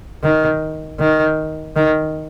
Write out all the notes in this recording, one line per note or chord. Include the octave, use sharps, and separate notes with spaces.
D#3
D#3
D#3